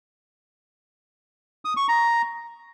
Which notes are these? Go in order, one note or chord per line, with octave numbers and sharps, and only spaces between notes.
D#6
C#6
A#5